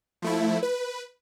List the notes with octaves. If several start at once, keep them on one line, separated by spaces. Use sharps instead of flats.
F3 A3 E4
B4